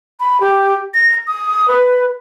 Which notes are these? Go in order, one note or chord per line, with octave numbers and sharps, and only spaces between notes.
B5
G4
A#6
D#6
B4